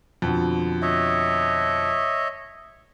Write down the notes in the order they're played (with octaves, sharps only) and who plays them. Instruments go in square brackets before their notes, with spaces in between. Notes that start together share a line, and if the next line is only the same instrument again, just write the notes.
[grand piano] F2 B2 D3
[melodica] C#5 D#5 E5